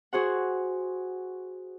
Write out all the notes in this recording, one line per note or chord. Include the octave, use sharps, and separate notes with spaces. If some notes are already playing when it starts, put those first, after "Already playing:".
F#4 G#4 C5 F#5